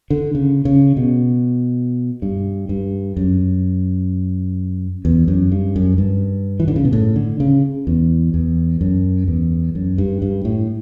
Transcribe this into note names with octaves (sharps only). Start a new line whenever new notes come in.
D3
C#3
C#3
B2
G2
G2
F#2
E2
F#2
G2
F#2
G2
E3
D3
C#3
B2
A2
D3
C#3
E2
E2
F#2
E2
F#2
G2
G2
A2